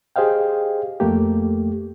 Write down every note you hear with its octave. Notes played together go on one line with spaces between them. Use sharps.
G4 G#4 C5 D#5 F5 G5
F2 A3 A#3 G4